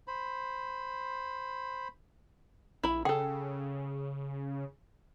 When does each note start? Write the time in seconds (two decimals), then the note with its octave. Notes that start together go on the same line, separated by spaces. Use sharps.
0.08 C5 B5
2.83 A#1 E4 B5
3.05 C#3 G#4 A4 G5